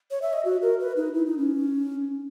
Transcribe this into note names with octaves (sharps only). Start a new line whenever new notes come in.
C#5
E5
D#5
F#4
A#4
B4
D#4
E4
D#4
C#4